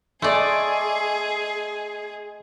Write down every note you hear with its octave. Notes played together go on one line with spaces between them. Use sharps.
A3 G#4 D5 D#5 G#5 C6